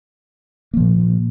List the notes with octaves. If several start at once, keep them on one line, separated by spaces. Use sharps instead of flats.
A#2 F3 A#3